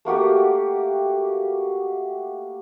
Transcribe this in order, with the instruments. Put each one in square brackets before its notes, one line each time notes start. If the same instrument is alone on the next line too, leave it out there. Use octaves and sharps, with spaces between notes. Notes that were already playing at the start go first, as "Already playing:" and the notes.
[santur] A3 A#3 F#4 G4